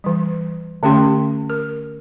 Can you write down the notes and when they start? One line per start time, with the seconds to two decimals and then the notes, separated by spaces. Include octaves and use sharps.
0.04 E3 G3
0.83 D3 A3 C#4 G4 G5 C6
1.50 A#4